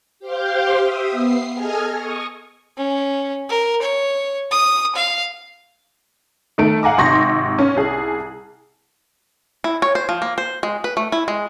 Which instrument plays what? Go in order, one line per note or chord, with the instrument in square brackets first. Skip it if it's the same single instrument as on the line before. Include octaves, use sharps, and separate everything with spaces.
[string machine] G4 C5 F5 G5
E5 D#6
B3 C7
G#4 A4 D#5 G#5 F6 G#6
C#6 D#6
[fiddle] C#4
A#4
C#5
D#6
F5
[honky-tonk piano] D#3 A3 D7
F5 F#5 G#5 A#5 D6
G#1 C3 C6 C#6 A#6
C#4
C2 G#4
[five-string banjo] E4
C#5
C5
F3
A#3
C5
G#3
B4
A3
E4
G#3